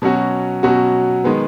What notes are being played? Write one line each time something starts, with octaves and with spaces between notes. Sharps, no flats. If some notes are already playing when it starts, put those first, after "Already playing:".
B2 F#3 C#4 F#4
B2 F#3 C#4 F#4
D#3 G#3 B3